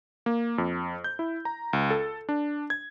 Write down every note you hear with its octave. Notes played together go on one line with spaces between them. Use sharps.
A#3
F2
G6
E4
A#5
C#2
A4
D4
G#6